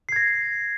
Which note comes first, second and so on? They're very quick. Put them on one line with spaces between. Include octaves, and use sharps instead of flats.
C7 G#6 A#6